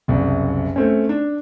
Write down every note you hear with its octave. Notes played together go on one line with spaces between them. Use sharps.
F#1 C2
A3 C4 C#4
D4